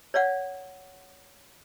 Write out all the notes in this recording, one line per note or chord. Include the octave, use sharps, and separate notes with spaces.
C#5 D5 F5 F#5